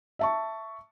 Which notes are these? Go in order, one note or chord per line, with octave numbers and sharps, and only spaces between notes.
E5 A5 C#6